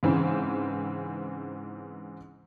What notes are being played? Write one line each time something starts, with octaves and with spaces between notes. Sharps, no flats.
G#2 C#3 E3 C4